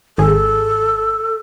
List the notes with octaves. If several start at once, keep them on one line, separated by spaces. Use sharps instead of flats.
G#1 G#4 A4